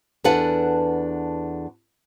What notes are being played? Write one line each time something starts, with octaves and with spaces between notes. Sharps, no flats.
E2 D4 A4 B4 F#5